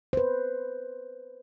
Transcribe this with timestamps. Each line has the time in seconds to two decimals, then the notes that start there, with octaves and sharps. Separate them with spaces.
0.13 B4 C5